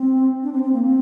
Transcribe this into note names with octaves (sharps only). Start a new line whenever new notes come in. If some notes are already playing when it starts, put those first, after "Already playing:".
Already playing: C4
D4
C4
C4
A#3
C4